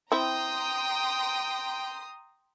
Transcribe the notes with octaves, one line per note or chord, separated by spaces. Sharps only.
C4 E4 G5 A#5 C6 D#6